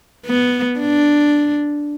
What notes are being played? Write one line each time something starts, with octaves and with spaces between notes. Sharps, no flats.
B3
D4